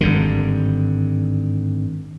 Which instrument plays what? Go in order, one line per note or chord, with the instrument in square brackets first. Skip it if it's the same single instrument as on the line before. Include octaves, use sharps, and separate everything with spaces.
[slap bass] G#1 G2 D3